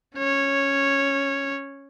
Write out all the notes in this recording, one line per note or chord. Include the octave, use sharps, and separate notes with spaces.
C#4 C#5